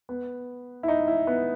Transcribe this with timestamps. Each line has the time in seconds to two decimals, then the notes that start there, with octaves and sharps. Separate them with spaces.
0.09 B3
0.83 E4
0.88 D#4
1.08 E4
1.27 B3